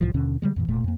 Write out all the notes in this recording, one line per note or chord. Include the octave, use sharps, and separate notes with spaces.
C2 A2 E3 F3
D#2 B2 D3 C#4
D3 G3 G#3
F2 A#2 E3
E1 A#2 A3
F2 A#3